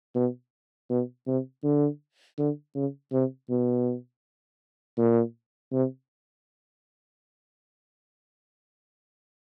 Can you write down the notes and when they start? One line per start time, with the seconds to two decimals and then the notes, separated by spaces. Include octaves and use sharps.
0.15 B2
0.90 B2
1.27 C3
1.64 D3
2.38 D3
2.75 C#3
3.12 C3
3.50 B2
4.98 A#2
5.73 C3